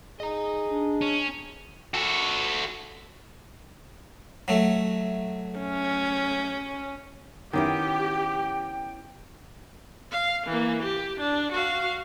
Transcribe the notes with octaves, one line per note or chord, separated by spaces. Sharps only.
G#4 D#5 A#5
D4
C#4
F#4 A4
F#3 A3
C#4
D#3 B3 C#4 E4 G4 G5
F5
E3 A#3
G4
D4
F#4 F5